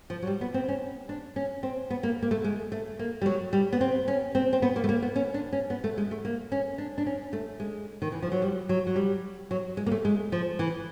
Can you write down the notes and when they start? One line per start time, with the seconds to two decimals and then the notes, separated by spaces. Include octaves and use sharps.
0.10 F3
0.22 F#3
0.27 G3
0.41 B3
0.54 C4
0.68 C#4
1.09 D4
1.36 C#4
1.63 C4
1.90 B3
2.03 A#3
2.22 A#3
2.31 A3
2.44 G#3
2.72 A3
2.99 A#3
3.22 G3
3.26 F#3
3.53 G3
3.73 B3
3.81 C4
4.08 C#4
4.35 C4
4.53 C4
4.62 B3
4.76 A#3
4.84 A3
4.89 A#3
5.02 B3
5.16 C#4
5.34 D4
5.53 C#4
5.70 B3
5.84 A3
5.98 G#3
6.11 A3
6.25 A#3
6.52 C#4
6.78 D4
6.98 D4
7.06 C#4
7.33 A3
7.60 G#3
8.02 D#3
8.12 E3
8.22 F3
8.32 F#3
8.42 G3
8.69 F#3
8.87 F#3
8.96 G3
9.51 F#3
9.77 G#3
9.86 A#3
9.92 A3
10.05 G#3
10.32 F3
10.59 E3